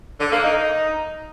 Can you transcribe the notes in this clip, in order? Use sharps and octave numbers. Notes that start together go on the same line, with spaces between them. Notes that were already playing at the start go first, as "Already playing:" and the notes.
D3
A#3
D#4